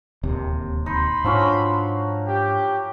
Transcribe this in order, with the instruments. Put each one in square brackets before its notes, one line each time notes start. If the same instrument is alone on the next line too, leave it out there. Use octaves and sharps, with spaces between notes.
[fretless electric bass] D1 D#2 C3
[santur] D#4 [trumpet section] B5 C6
[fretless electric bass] G#2 D4 [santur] F3 F#3 C#4
[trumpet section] G4